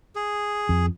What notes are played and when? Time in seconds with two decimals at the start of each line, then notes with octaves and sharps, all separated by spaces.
0.15 G#4
0.69 F2